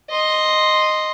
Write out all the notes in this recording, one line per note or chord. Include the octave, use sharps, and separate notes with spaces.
D#5 C6